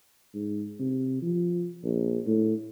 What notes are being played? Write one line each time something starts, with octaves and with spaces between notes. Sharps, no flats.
G#2
C3
F3
A#1
A2